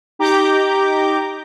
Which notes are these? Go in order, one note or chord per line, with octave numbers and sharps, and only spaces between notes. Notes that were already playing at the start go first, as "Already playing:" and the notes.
D#4 G4 A#5 D6 G6